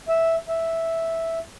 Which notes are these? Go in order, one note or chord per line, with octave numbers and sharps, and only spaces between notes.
E5
E5